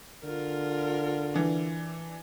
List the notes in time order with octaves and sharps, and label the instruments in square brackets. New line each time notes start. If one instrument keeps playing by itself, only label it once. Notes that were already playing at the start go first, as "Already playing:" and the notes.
[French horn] D3 [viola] F4 A#4
[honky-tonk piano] E3 D4